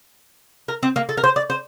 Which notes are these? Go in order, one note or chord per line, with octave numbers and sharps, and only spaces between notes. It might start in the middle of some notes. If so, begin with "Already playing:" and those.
A#4
C4
A#3
A4
A#4
C5
D5
C5